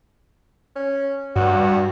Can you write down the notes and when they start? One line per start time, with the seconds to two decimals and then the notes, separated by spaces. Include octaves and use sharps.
0.76 C#4
1.36 G2 F#4